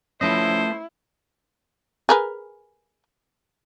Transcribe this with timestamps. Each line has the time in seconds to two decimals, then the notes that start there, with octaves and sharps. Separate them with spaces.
0.21 F3 A3 C#4 E4 B4 C5 D#5
2.09 G#4 A#4 B4